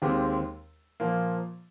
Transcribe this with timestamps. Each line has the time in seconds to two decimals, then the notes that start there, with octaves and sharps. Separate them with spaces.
0.02 D#2 D#3 G#3 C4 G4
1.00 A#2 F3 A#3